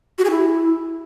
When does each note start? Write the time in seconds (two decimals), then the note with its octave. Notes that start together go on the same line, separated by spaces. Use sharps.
0.18 F#4
0.25 G#4
0.31 E4